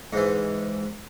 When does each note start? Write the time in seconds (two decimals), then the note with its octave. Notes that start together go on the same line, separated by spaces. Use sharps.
0.13 G#2 E3